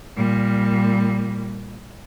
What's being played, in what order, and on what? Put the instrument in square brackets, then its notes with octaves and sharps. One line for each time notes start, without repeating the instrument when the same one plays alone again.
[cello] A#2 G3